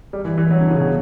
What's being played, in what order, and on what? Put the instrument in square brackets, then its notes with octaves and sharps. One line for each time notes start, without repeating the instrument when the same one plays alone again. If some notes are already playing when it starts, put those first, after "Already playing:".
[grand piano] G3
E3
E3
F#3
D3
C#3
B2